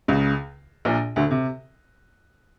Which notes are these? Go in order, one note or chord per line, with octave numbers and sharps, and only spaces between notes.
C#2 C#3
A#1 A#2
D2 D3
C3